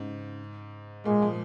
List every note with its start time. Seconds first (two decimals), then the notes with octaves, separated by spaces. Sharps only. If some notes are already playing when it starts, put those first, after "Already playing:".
Already playing: G#2 C#3
1.06 A#2 G#3
1.22 F3